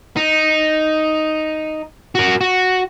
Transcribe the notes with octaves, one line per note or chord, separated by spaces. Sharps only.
D#4
F#4 A#4
F#4